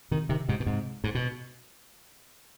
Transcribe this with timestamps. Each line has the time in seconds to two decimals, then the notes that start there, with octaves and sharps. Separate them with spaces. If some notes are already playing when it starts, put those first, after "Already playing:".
0.11 C3 D#3
0.29 C3 D#3
0.49 G#2 C3
0.60 B2
0.66 G#2 C3
1.04 G#2
1.15 B2